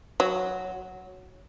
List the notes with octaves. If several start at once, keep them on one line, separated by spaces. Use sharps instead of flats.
F#3